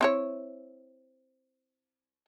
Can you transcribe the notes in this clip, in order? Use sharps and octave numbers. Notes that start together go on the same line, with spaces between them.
C4 E4 C#5